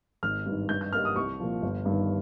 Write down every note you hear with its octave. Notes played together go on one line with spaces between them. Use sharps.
G#1 F6
G2 D#3
G2 G6
G6
G3 A#3 F6
D#6
C2 C#6
A#2 F3
G1
G2 D#3